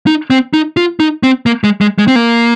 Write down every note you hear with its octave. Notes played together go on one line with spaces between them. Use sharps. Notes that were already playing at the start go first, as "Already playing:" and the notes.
D#4
C4
D#4
F4
D#4
C4
A#3
G#3
G#3
G#3
C4
A#3